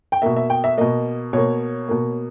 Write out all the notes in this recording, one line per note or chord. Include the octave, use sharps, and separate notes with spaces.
G5
B2 A#3 E5
E5
G5
E5
B2 A#3 D#5
B2 A#3 C#5
B2 A#3